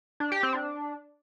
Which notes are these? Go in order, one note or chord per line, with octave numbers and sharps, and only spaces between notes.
D4
G4
C4
D4